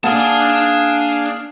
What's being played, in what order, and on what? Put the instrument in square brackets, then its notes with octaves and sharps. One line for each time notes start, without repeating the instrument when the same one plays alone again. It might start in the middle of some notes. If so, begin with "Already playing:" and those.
[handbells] A#3 [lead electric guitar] D4 A5 [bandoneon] G#4 F5 [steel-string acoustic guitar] F#5 G#5